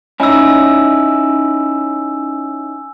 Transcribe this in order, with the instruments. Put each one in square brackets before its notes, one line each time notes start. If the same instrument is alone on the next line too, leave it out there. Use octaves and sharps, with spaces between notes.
[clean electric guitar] C#4 D#4 E4 [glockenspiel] G#5 E6